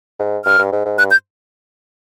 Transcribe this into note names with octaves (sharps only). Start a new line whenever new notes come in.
G#2
G2 F6
G2
G#2
G#2
G2 F#6
G6